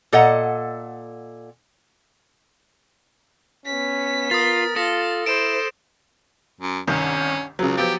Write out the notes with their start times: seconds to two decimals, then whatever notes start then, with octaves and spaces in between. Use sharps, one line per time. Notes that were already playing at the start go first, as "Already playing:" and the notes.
0.13 A#2 A4 D#5 F#5 A#5
3.66 B3 C#4 B6
4.31 F4 A#4 D#6 A6
4.76 F4 A4 D#6 A#6
5.26 E4 C5 D7 E7
6.60 F#2
6.88 G1 C2 D#3 C#4
7.59 C#2 C#3 F#3
7.77 F3 F#3 B3 G4